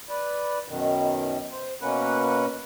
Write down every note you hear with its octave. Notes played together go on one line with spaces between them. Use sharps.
B4 D5
F#2 B2 D#3
C5
B2 A#3 C#4 B4 F#5